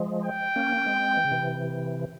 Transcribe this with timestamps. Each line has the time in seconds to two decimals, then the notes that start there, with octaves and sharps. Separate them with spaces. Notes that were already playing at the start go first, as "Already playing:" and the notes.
Already playing: F3 G#3
0.25 G5
0.56 A#3 C#4
0.77 C#4
0.86 G#3 C4
1.17 E3
1.25 C#3
1.31 C3 E3